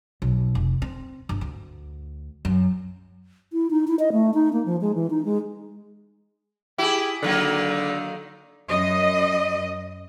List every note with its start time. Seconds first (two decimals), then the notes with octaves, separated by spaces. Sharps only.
0.22 B1
0.55 F1
0.82 C4
1.29 G1
1.41 D2
2.45 F#2
3.53 E4
3.71 D#4
3.87 E4
3.99 D#5
4.12 A3
4.34 D#4
4.53 A#3
4.66 F3
4.81 G#3
4.95 E3
5.10 D#4
5.25 G#3
6.78 E4 G4 G#4
7.23 D3 D#3 F#3 A#3
8.68 F#2 D#5